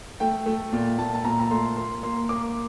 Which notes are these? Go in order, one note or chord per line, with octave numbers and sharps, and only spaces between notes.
A3 G5
A3
A#2
A#2 A5
A5
A#2 A#5
A#5
A3 C6
A#3 C6
A#3 C6
A#3 D6